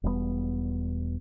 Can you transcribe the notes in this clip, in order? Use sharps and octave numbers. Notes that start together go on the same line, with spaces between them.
E1 G3 G#3 B3